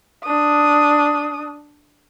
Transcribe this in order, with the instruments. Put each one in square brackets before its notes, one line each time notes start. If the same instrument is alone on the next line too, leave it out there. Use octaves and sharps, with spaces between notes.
[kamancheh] D4 D#6